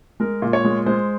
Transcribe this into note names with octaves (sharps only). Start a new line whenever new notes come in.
G#3 A#4
A#2
C#5
G#3
G#3 C5